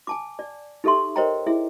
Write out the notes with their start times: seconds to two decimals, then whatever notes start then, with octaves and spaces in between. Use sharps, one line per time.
0.07 G#5 A5 D6
0.39 D5
0.84 D#4 G4 A4 E5 C6
1.16 A#4 C5 C#5 D#5 G5 A#5
1.47 E4 G#4 E5